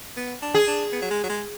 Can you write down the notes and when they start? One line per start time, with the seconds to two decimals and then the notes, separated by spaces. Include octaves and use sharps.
0.17 B3
0.42 D4
0.54 G#4
0.67 D4
0.92 B3
1.02 F#3
1.11 G#3
1.24 F#3
1.29 G#3